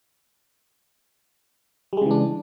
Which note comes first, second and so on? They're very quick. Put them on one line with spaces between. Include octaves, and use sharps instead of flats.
G3 G#3 C#3 E3 D4